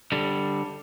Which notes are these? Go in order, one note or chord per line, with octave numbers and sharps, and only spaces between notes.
D3 G3